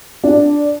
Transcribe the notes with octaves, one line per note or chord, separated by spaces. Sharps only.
D4